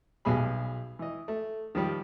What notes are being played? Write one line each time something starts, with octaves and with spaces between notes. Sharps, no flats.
B1 B2 G3 G#4 B5
E3 D#5
A3
D#3 F3 G3